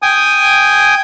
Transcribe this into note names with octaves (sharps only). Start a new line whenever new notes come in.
G5 G#5 D#6